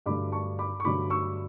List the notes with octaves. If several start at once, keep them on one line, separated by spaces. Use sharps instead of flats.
G2 D3 F#3 A3 B5 D6
A5 C#6
B5 D6
C#6
G2 D3 F#3 A3 B5 D6
C#6 E6